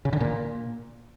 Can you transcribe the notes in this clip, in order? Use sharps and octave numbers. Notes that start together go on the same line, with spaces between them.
C#3
D3
A#2